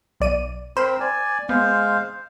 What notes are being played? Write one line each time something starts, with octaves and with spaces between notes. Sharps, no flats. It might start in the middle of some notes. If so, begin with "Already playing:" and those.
B1 D5 D#7
C4 A#4 C5 B5 E7
D5 G#5
G#3 B3 C5 F5